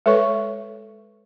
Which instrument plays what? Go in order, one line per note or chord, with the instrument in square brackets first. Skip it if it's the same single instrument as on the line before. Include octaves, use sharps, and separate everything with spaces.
[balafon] G#3 A4 B4 C#5 C#6